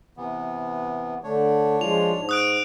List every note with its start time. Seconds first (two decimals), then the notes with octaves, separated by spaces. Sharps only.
0.17 C3 E3 B3
1.24 D3 A3 D4 C#5
1.81 F3 G#3 F4 F7
2.15 G#2
2.29 C#6 D#6 F#6 D7